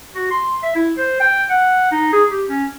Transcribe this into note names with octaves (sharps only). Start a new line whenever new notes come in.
F#4
C6
E5
E4
C5
G5
F#5
D#4
G#4
G4
C#4